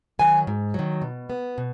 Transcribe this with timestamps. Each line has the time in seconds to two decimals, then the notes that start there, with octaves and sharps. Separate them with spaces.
0.19 D#3 F#3 G#5
0.47 G#2
0.74 D#3 F#3
1.02 B2
1.30 B3
1.58 B2